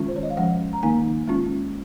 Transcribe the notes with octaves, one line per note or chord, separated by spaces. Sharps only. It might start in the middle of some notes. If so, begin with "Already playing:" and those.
Already playing: D#3 G#3 C#4 F4
C5
C#5
D#5
F5
F3 G#3 C#4 F#5
A#5
D#3 A#3 D#4 G#5
G#3 C#4 F4